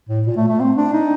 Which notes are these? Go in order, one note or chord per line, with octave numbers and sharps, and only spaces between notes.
A2
A#2
A3
A3
C4
D4
D#4